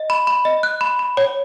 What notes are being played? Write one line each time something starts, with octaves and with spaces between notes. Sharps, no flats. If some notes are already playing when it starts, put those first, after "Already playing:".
Already playing: D#5
B5
B5
D#5
F#6
B5
B5
C#5